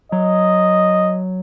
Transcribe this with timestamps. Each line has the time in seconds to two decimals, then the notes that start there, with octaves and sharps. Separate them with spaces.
0.12 F#3 D#5